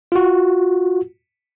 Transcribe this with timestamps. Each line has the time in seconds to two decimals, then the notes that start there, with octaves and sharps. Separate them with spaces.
0.12 F4 F#4